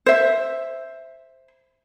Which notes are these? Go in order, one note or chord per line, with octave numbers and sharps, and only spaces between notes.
C5 E5